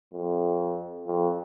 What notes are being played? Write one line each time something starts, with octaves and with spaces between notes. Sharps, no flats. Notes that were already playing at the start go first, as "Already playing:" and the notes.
F2
F2